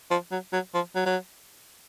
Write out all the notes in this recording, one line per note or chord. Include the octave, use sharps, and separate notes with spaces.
F3
F#3
F#3
F3
F#3
F#3